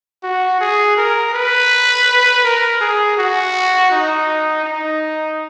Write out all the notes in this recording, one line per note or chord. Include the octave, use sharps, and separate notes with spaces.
F#4
G#4
A#4
B4
A#4
G#4
F#4
D#4
D#4